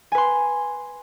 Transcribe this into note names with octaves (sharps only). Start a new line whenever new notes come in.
B4 G#5 C6